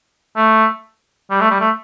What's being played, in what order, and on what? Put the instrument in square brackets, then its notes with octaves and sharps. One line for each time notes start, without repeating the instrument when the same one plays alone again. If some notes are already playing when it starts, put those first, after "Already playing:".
[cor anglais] A3
G3
A3
G3
A3